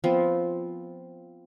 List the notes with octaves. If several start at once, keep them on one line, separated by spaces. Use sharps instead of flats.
F3 B3 C4